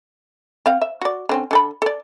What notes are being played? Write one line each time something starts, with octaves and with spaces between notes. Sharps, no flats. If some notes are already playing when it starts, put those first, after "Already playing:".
C4 F5 F#5
E5
F#4 D5
D3 C4 C#4
D3 A4 B5
A4 D5